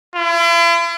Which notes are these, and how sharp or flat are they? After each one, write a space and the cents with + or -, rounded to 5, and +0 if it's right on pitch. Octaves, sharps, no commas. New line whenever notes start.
E4 +45